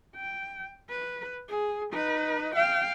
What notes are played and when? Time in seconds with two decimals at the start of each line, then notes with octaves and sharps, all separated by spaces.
0.16 G5
0.90 B4
1.49 G#4
1.93 D#4 B4
2.55 F5 G5